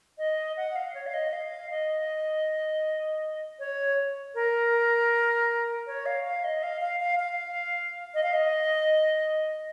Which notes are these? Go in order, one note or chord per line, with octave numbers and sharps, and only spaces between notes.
D#5
F#5
F5
C#5
F5
D#5
F5
D#5
C#5
A#4
C#5
F5
F5
D#5
F5
F5
F5
F5
D#5
F5
D#5